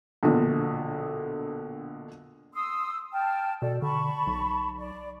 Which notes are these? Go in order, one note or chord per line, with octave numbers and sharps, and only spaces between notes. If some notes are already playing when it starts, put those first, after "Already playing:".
A#1 B2 D3
C6 D#6 E6
G5 A5 F6
B2 A4 D5
D3 A5 B5 C#6
B1
D5